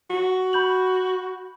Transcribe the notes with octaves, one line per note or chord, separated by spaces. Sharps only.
F#4
B5 G6 F#7